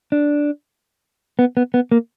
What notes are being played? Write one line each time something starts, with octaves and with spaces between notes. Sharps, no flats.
D4
B3
B3
B3
A#3